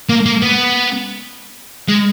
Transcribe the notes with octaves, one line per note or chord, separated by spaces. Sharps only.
A#3
A#3
B3
G#3